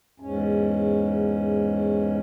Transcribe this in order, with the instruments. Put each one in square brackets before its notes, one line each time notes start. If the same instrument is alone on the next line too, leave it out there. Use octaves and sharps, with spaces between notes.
[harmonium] E2 G#2 C#4